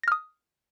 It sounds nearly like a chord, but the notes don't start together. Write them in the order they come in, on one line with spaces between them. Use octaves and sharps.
A#6 F6 D#6